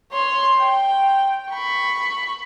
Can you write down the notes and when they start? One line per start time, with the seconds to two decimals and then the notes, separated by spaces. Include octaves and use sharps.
0.12 C#5 C6
0.59 G5
1.50 B5 C#6